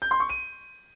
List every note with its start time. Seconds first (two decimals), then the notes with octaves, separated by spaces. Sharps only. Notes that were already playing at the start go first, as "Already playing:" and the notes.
0.02 G6
0.11 C6
0.20 C#6
0.29 D#7